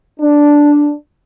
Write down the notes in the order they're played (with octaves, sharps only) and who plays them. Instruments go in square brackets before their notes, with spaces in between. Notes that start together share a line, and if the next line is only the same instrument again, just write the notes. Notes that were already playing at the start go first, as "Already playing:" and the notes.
[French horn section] D4